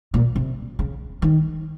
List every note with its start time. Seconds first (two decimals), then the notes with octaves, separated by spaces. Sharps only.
0.14 A#2
0.36 C3
0.79 C#3
1.22 D#3